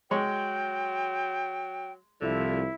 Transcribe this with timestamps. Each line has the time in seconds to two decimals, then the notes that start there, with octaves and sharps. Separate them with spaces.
0.11 F#3 G#3 C#5 G5
2.21 C2 D3 F3 E4